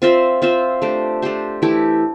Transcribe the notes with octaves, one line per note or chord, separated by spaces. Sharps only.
C4 F4 C5 E5
C4 F4 C5 E5
A3 D4 G4 C5
A3 D4 G4 C5
E3 A3 E4 G4